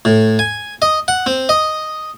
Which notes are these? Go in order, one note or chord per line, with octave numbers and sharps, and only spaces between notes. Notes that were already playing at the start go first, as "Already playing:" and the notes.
A2
G#5
D#5
F#5
C4
D#5